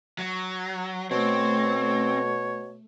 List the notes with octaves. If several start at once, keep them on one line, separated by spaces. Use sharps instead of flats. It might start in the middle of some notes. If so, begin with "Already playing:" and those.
F#3
B2 A3 C4 C#5